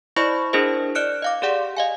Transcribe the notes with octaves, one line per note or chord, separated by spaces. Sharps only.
E4 C5 D5 D#5 B5 C#6
D4 E4 G#4 A#4 C5 D#5
D5 D#5 F6 F#6 C#7 D7
D#5 F5 D6
G4 G#4 D5 F#5 C6
D#5 F5 G#5